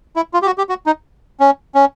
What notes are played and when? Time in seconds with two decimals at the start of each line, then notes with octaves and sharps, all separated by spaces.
0.16 E4
0.34 F4
0.42 G4
0.46 F#4
0.58 G4
0.69 F#4
0.86 D#4
1.40 C#4
1.75 C#4